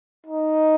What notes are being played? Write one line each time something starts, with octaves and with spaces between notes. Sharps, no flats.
D#4